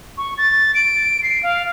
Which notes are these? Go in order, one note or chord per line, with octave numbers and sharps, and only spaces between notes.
C#6
A6
D7
C7
F5